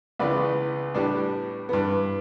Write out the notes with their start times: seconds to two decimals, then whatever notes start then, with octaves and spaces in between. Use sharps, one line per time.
0.19 C#2 C#3 E3 B3 B4 D5
0.95 A2 G3 B3 D4
1.69 G2 E3 B3